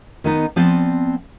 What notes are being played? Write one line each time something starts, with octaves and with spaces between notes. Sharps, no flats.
D#3 B3 D#4
F3 B3 C4 C5 D5